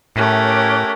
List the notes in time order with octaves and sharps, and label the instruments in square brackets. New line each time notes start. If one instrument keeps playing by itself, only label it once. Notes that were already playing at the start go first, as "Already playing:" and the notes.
[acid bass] A2 [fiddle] A3 A#4 [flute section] C#4 G4 F#6